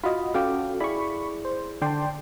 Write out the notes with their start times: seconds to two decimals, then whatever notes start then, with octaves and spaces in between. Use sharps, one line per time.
0.04 F4 F#4 D#5 B5
0.34 C#4 F#4 A4 F5 G5 D6
0.80 E4 G#4 D5 B5 C#6
1.45 C5
1.82 D3 D5 G5 A5 C6